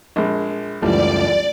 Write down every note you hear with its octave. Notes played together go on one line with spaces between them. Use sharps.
A#1 G#3
C#2 F#2 E3 F3 G3 A3 D5